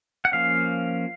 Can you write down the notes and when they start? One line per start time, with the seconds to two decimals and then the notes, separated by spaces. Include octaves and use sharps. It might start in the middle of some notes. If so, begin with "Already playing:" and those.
0.25 F#5
0.32 F3 A#3 C#4 F5